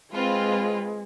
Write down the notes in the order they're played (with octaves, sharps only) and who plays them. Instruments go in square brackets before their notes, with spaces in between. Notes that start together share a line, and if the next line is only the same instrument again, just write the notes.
[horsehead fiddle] G#3 [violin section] C4 F4 B4